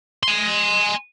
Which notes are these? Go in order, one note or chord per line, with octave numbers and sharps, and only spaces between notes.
G#5 C6